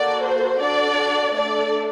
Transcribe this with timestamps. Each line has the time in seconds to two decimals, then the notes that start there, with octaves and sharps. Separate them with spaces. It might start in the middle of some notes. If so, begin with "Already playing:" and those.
Already playing: A#3 F#4 A4 D5
0.24 C5
0.61 D4 F#4 A4 D5
1.34 A3 D4 A4 D5